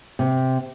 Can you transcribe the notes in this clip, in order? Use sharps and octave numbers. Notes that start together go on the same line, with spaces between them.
C3